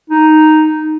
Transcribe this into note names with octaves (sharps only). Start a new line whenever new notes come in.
D#4